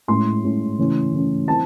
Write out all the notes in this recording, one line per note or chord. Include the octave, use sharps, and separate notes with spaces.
A2 G#3 C#4 C6
A2 G#3 C#4
C#3 E3 A3 C#4
C#3 E3 A3 C#4
E3 C4 A5